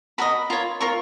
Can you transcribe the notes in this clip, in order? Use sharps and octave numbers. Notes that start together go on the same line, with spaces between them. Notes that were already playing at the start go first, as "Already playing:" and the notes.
F#4 A#4 D#5 B5
F4 A#4 C#5
F4 A#4 C#5 C#6